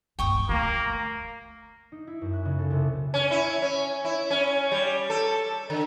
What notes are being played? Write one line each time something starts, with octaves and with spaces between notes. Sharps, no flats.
A#1 G2 G5 C#6 D#6
D2 A3 A#3
D#4
E4
F#2
F#6
C#3
A4
C2
C#4
E4
C#4
E4
C#4
G3
A4
D3